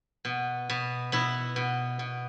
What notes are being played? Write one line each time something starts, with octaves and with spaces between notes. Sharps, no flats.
B2
B2
B2 E4
B2
B2